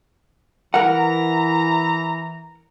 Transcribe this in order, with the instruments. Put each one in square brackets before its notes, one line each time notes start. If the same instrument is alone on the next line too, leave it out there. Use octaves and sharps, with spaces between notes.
[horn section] E3 A#5 [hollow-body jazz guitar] A#4 F#5